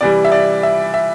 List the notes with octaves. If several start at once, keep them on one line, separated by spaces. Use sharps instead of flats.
C3 E3 G3 D5
E5
D5
E5
E5